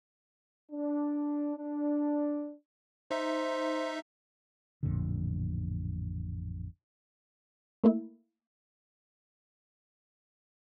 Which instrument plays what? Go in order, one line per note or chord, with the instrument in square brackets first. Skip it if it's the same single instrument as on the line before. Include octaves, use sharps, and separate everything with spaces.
[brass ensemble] D4
D4
[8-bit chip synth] D#4 E5 [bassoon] C5
[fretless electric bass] A1 F2 A#2 D3
[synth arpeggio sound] A3 A#3 E4